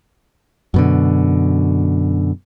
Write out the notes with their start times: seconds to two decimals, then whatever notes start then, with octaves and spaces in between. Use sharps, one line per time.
0.74 F#2 B2 D3